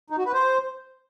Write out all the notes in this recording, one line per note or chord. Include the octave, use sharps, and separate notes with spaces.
D#4
F#4
B4
C5